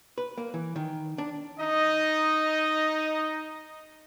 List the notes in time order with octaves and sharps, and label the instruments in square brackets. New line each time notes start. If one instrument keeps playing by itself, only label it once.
[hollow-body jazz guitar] B4
A#3
E3
D#3
D4
[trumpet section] D#4 D#5